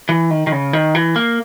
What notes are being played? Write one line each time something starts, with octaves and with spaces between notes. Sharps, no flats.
E3
D#3
D#3
C#3
D#3
E3
A#3